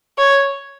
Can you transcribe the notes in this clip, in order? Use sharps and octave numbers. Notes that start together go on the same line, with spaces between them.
C#5